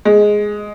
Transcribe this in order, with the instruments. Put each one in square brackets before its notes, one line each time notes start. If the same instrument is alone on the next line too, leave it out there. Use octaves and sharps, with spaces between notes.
[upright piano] G#3